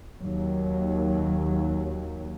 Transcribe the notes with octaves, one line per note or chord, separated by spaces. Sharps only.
D#2 F#3